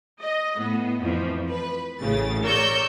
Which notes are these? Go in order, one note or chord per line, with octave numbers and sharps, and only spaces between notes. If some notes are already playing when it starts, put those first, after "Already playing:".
D#5
A2 B3
F2 E3 F3
B4
A1 A2 C#3 A6
A#4 C#5 D5 C#6 E6 G6